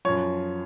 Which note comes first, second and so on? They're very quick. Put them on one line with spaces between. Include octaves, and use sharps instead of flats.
F3 C#5 F#2